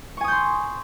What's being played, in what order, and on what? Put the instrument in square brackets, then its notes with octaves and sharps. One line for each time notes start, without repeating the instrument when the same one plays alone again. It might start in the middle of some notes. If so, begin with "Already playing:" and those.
[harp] C#6
G#5
D#6
G6
C6